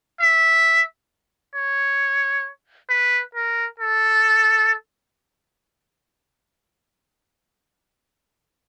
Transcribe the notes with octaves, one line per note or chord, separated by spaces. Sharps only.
E5
C#5
B4
A#4
A4